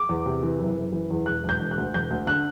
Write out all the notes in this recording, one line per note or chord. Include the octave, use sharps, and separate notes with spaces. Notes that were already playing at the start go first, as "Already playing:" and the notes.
Already playing: D6
E2
C3
E3
F#1
F#1
E3
E2
E1 F#6
E1 G6
E1
F#6
D2
E1 G6
D2
D3 F#6